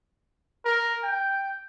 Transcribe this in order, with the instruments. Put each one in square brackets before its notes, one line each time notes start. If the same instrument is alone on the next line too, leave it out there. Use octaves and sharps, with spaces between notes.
[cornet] A#4
G5